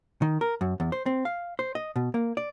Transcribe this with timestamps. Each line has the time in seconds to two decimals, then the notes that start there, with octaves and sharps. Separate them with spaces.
0.22 D#3
0.41 A#4
0.61 F#2
0.80 E2
0.92 C5
1.06 C4
1.25 F5
1.59 C5
1.75 D#5
1.96 B2
2.14 A#3
2.37 D5